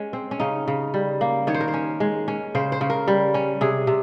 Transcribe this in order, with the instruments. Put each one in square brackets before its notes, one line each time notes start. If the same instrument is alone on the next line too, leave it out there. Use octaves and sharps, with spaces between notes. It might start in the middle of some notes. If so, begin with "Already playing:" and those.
Already playing: [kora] G#3 C#4
C4
C#4
C#3 D#4
C#3
G3
A#3
D#3 C#5
C5
A#4
C5
C#4
G#3
C#4
C#3 C5
C5
C#3
A#4
G3
C#4
C3 G#4
C3